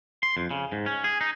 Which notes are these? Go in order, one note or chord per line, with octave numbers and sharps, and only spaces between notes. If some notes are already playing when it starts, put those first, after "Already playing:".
C6
F2
C#3
G#2
C#4
G#4
D#4